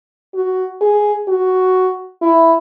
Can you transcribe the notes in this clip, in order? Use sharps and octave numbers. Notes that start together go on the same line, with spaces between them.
F#4
G#4
F#4
E4